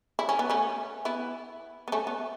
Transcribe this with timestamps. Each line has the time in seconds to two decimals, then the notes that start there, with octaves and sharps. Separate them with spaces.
0.19 E4
0.29 C#4
0.39 B3
0.50 A3 C#4
1.05 B3 E4
1.88 B3
1.92 A3 C#4
2.07 B3